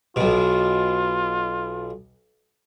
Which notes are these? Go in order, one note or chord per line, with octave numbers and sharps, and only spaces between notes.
B1 B2 F4